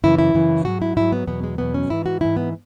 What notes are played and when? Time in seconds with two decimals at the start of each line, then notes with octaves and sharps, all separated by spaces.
0.03 F#2 C#3 E3 E4
0.19 E4
0.34 F#2 C#3 E3
0.65 G#2 F#3 F#4
0.82 E4
0.97 G#2 F#3 E4
1.12 B3
1.27 E2 B2 F#3 B3
1.44 G#3
1.58 E2 B2 F#3 B3
1.74 C#4
1.89 G#2 E3 E4
2.06 F#4
2.21 G#2 E3 E4
2.37 B3